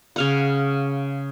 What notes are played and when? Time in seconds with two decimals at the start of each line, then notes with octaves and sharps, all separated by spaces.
0.16 C#3 F5 F#5